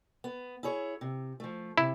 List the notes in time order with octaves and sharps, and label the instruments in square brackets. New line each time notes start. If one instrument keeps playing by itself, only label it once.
[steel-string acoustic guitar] B3
E4 G#4 C#5
C3
F3 A3
[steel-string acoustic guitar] C3 [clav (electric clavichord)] E4